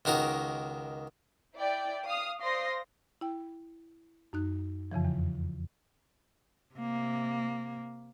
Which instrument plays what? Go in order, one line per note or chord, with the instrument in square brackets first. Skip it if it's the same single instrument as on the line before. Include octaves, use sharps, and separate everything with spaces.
[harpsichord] C#2 D#3 F#4 A#4
[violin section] E4 D5 G5
F5 D#6 F6
C5 D5 F5 C6 D#6 A#6
[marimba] E4 G5
F#2 D#4 F#6
F2 C#3 E3 F3
E2
[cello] C3 A#3